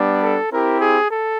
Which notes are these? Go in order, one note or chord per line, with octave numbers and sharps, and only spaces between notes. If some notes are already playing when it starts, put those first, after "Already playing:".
Already playing: G3 B3 D4
A4
C4 E4 G4 A#4
G#4
A4